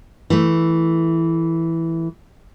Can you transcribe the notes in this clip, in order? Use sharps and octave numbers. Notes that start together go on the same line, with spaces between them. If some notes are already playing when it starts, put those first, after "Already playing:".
E3 A3